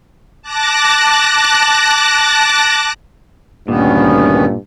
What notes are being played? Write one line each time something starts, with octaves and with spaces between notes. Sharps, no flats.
A5 D6 F#6 A#6
D2 G2 A#2 D#3 B3 C#4